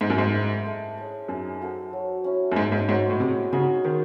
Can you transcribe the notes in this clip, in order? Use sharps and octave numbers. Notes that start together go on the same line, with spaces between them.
G#2 C4
F#2
G#2
E4 G#4
A3
C#4 G#4 D#5
F#2 D#4
F#4 A4 C5
F#3
C#4 E4
F#2
G#2 G#3
G#2
G#2 C#4 F#4
A2
C3 G#3
C#3 D#4 F#4
D#3 G#3